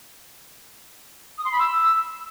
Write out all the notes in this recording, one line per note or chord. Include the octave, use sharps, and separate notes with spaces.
D#6
C6
B5
E6